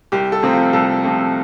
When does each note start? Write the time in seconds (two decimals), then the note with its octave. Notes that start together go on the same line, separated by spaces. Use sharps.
0.12 C2 G4
0.32 A4
0.42 C3 F3 A3 C4
0.53 F4
0.73 C2 A4
1.04 C3 F3 A3 C4